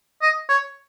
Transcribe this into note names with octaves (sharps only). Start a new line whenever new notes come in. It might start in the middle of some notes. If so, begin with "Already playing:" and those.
D#5
C#5